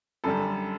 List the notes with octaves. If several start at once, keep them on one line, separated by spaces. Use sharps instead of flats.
F#2 D3 G3 A4